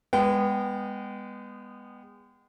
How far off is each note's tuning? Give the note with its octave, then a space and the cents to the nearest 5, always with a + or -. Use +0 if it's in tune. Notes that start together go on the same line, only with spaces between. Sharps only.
G#3 -30 B3 -5 G5 -30